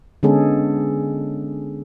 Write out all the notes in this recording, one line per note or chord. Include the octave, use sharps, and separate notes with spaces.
D3 G#3 B3 C#4 G#4 A4